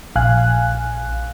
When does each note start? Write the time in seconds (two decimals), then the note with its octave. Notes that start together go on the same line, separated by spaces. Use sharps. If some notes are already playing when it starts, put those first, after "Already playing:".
0.16 A#1 F5 G#5 F#6